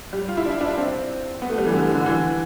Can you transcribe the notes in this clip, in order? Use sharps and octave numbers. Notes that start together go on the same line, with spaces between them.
G3
F4
E4
D4
D4
C4
B3
A3
G3
E3
D3
D3
E3